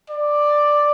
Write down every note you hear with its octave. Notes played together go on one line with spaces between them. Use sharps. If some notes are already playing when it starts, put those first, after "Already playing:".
D5